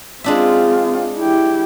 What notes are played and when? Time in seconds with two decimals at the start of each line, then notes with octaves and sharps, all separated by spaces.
0.24 G#3 C4 D4 F4 E5
1.19 E4 G4